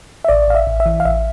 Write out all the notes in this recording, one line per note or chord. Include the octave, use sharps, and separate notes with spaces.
E5
A1 D5
A1 F5
E5
A1
E5
E3
F5
A1 E5